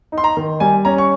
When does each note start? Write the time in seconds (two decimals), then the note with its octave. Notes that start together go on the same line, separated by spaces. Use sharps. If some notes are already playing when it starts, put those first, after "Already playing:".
0.12 D#4
0.18 C6
0.24 A#5
0.37 D#3
0.60 G3 G#5
0.85 C#4 A#5
0.98 C#6